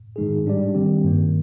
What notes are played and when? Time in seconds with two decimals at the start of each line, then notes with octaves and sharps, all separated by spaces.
0.16 G#2 D#3 G#3 D#4 G#4
0.46 G3 D4 G4 D5
0.74 D#3 G3 C4 G4
1.04 G2 D#3 A#3